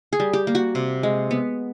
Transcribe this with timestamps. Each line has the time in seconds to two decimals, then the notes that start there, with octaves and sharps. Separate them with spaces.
0.13 G#4
0.20 G3
0.33 G4
0.47 A#3
0.55 F#4
0.75 C3
1.03 G#3
1.31 B3